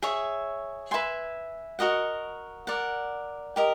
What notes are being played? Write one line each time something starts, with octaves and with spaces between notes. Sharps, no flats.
G#4 C#5 E5
B4 E5 G#5 C6
F#4 A#4 D#5 F#5
A#4 D5 F#5
G4 A#4 D#5